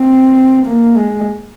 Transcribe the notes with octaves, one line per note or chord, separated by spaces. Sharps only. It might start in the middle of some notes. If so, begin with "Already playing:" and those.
Already playing: C4
A#3
G#3